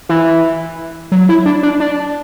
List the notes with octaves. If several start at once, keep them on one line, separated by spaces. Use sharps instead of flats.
E3
F#3
E4
D4
D4
D4